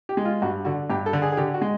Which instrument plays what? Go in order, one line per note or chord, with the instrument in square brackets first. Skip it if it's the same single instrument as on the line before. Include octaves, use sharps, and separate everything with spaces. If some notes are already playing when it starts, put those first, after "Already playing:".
[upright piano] G4
G#3
F4
G2 F#4
D3 F#4
G2 G4
A4
D3
G#4
G#4
D3 G4
F#4
G#3